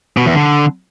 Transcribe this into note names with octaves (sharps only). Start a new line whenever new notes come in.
B2
E2
D3